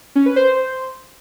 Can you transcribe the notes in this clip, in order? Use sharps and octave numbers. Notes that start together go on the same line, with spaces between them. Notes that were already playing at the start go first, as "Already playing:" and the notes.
C#4
B4
C5